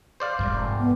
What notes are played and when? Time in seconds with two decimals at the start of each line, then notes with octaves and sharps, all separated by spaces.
0.20 C5 D5 F5
0.39 F1 G#2
0.80 B3